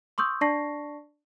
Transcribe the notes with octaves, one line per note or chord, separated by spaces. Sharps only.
C6 C#6 D#6 E6 G6
D4 D5 A5 C#6 A#6 C7